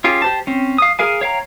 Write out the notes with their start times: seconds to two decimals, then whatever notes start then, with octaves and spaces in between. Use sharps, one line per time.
0.04 C#4 F4 G4 G#4
0.22 G4 C5 A5
0.47 C4 C#4
0.78 F5 D#6
0.99 G#4 A#4 F5 G#5
1.21 C#5 F5 G5 A#5